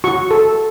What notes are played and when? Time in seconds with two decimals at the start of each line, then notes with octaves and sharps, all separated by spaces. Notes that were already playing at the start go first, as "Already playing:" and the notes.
0.04 F#4 C#6
0.31 A4